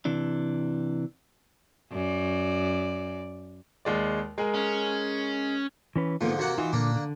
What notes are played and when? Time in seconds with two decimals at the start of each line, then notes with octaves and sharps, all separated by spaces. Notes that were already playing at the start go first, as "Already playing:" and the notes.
0.05 C3 E3 D4
1.91 F#2 D5
3.85 D#2 G#3 D5
4.38 G#3 G#4 A#4
4.54 C#4
5.96 E3 C#4 B4
6.21 G#2 D3 F3 A#3 B3 F4
6.39 C3 A#3 F#4 F#5
6.58 E3 D#4 F4 F#4
6.73 A#2 D3 A#3 D4
6.95 D3